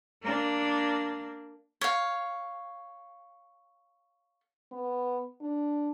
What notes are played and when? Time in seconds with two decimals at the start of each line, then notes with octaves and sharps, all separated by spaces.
0.23 A#3 D4
1.81 C#5 F5
4.71 B3
5.41 D4